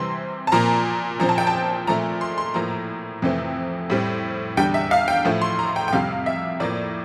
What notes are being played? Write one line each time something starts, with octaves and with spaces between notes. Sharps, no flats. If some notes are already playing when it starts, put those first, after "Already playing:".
Already playing: C3 E3 G3 C4 C6
A5
A#2 F3 A#3 A#5
A#2 F3 C4 A#5
A5
G5
A5
A#2 F3 A3 A#5
C6
C6
A2 F3 A#3 A#5
F2 C3 E3 A3 C4
A2 G3 C4
E2 D3 G3 G5
E5
F5
G5
A2 F3 A3
C6
A#5
G5
G5
F2 C3 G3 F5
E5
A2 F3 A#3 D5